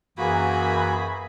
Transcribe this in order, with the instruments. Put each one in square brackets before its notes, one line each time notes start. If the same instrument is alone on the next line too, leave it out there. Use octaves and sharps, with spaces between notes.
[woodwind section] F#2 E3 [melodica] A#3 F#4 [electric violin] G#4 B5